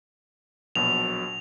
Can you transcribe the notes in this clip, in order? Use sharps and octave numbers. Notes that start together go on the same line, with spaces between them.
A#1 B2 F#3 F7